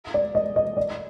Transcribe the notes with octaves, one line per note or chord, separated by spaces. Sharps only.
D5
D#5
D#5
D5